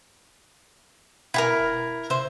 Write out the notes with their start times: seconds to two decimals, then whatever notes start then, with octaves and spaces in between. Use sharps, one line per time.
1.34 B2 E4 G4 A#4
1.60 E1
2.10 C3 C5 E5